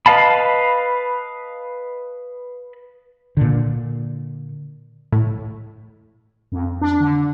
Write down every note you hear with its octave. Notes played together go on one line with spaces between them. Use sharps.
B4 D#5 F5 A5 B5
A#2 D3
A2
F2
D4
D3